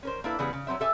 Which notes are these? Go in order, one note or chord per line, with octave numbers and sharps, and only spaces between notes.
C#4 A#4 C5
A#3 D4 E4 A4 B4
C#3 E3 G3 B3 G#4 B4
C#3
F#3 G#3 B3 C4 E5
G4 A4 E5 G#5